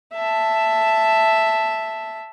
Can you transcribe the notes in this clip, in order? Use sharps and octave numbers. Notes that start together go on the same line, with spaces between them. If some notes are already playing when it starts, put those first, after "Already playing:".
E5 A5